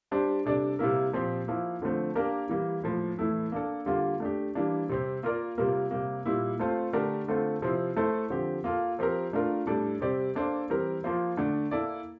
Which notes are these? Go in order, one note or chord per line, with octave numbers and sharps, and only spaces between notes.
G3 D4 G4 C5
C3 G3 D4 A4 D5
C3 G3 A#3 E4 A#4
A#2 F3 C4 G4
F3 A#3 E4
D3 F3 A3 C4
A#3 D4 G4 A#4
E3 G3 A#3
A2 F3 A#3
A2 E3 A3 E4
A#3 D4 A4
D3 G3 A#3 F4
A3 D4 G4
E3 G3 A#3 D4
C3 G3 C4 G4
A#3 F4 A#4 D5
C3 G3 A#3 F4 A#4
C3 G3 A#3
A#2 G3 A#3 E4
A3 C4 F4 A4 C5
D3 A3 D4 G4 A#4
D3 A3 C4 F4 A4
C3 F3 C4 E4
A3 E4 A4 C5
D3 F3 C4 G4
A#3 F4 A4
F3 C4 G4 A#4
A3 D4 F4 A#4
A2 G3 D4 A4 D5
C3 G3 C4 G4 D5
A#3 D4 A4 C5
E3 G3 C4 G4 A#4
F3 A#3 F4 C5
D3 A3 D4
A#3 E4 A4 D5